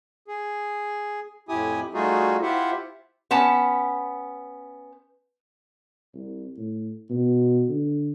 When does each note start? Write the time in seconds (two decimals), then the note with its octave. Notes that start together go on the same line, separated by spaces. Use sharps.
0.28 G#4
1.49 F2 A2 E4 G4 G#5 D#6
1.94 G3 A3 D#4 F4 F#4 G#4
2.42 E4 F4 G4 C5 E5 F#5
3.31 B3 C#4 A5
6.14 C2
6.57 A2
7.10 B2
7.69 D3